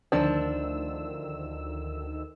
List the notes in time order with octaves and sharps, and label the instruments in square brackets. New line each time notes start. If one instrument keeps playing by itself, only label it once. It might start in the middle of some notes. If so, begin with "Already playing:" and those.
[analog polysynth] D2 D#3 E6 [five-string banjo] F3 D4